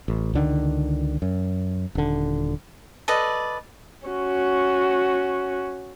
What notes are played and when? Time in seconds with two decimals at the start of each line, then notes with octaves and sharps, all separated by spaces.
0.08 A1
0.34 C#2 D3 D#3
1.22 F#2
1.95 D#1 D3
3.08 A4 B4 D5 D#5
4.07 C#4 F#4